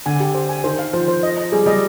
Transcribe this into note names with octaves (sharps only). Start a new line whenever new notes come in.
D3 G#5
G4
C5
G#5
D#3 C5
F5
F3 C5
C5
D#5
D#5
G3 G#4
G3 D#5